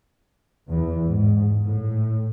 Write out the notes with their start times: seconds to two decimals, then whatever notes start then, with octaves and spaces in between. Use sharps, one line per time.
0.68 E2
1.06 G#2
1.63 A2